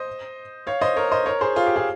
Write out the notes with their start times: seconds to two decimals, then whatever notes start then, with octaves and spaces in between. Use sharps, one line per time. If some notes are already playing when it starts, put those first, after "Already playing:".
Already playing: C5 D#5
0.67 C#5 F5
0.81 C5 D#5
0.96 A#4 C#5
1.11 C5 D#5
1.26 A#4 C#5
1.41 G#4 C5
1.56 F4 G#4
1.66 G4
1.76 F4 G#4